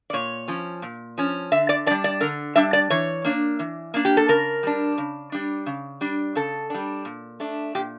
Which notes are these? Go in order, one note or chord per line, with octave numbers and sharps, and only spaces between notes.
D5
A#2 C#5
F3 C#4
A#2
F3 C#4
D3 E5
D5
G3 D4 D5
D5
D3 A#4
G3 D4 E5
D5
E3 C#5
A#3 D4
E3
A#3 D4
G4
A4
C#3 A#4
G3 D4
C#3
G3 D4
C#3
G3 D4
C#3 A4
G3 D4
A#2
A3 D4
A#2 G4